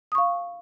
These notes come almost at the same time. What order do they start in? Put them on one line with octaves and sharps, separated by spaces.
D#6 C#6 F5